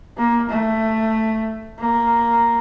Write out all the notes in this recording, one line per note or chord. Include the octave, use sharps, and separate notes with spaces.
A#3
A3
A#3